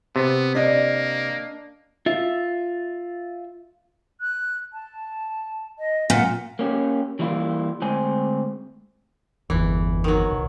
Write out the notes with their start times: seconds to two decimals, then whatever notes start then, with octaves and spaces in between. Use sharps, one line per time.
0.16 C3 B3
0.55 A#3 D4 D#5
2.06 F4 E5
4.21 F#6
4.73 A5
5.79 D#5
6.10 A#2 F#5
6.59 A#3 C#4 G4
7.19 E3 G3 A#3 E4 F4
7.82 D2 G#3 C4 G#5
9.50 G1 E2 E3
10.04 D#3 F#3
10.31 B1